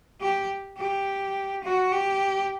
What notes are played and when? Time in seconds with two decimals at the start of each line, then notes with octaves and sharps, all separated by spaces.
0.21 G4
0.78 G4
1.64 F#4
1.92 G4